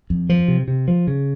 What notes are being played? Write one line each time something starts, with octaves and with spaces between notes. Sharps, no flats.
F2
F3
C3
C3
F3
C#3